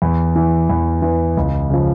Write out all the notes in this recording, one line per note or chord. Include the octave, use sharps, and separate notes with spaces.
E2
E3
E2
E3
C#2
C#3 F3